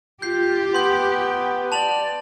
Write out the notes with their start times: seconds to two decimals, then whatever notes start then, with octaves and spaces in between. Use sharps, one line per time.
0.22 F4 G4 G6 C7
0.75 B3 C6 G6
1.06 G5
1.72 D5 A5 F7 F#7